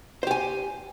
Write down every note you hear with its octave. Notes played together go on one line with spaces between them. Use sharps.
G4 C5 G#5